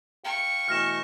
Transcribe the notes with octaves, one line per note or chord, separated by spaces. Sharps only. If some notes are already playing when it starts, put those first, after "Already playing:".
F5 G5 C#6
B2 E3 A3 F6 A#6 E7